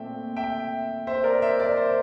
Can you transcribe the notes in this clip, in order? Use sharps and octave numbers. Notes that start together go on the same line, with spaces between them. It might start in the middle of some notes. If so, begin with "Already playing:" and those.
Already playing: A#2 A3 C4 E5 G5
E5 G5
C5 E5
A#4 D5
C5 E5
A#4 D5
C5